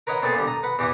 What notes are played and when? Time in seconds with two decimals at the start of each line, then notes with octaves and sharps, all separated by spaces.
0.07 A#4 B4 C#5 D#5 F#5
0.23 A#2 B3 C4 A4 G#5
0.36 D3 G3
0.47 A#5 D#6
0.63 B4 F#5 B5
0.79 E2 E3 G4 E5 F#5 D#6